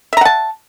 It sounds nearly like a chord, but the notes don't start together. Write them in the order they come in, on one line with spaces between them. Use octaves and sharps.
E5 A#5 F#5 A5